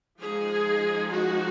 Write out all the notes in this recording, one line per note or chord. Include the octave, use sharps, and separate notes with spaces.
F3 G#3 D#4 G#4
F#4